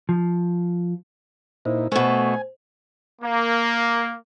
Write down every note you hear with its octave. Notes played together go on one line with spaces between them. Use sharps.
F3
A#2 D#4 E4 C5
B2 A3 C5 G#5
A#3